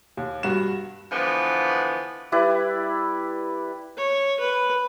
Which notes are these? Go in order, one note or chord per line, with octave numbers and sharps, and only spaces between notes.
D#2
G2 F#4 E7
D3 E3 F3 B3
G3 E4 B4 D5
C#5
B4